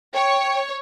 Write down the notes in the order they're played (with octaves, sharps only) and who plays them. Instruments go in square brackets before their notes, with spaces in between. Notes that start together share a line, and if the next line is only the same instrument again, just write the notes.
[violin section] C#5 [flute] G5